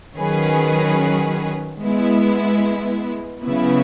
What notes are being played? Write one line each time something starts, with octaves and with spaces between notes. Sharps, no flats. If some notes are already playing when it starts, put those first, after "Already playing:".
D#3 F#3 C#4 G#4 B4
G#3 B3 E4
C#3 F#3 B3 E4